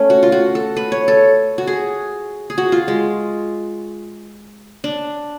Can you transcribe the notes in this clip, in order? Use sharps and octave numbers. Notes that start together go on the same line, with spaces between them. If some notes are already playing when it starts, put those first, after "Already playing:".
Already playing: A3 C#4
F#4
F4
F#4
A4
B4
C#5
A4
F#4
G#4
G#4
F#4
F4
G#3
D4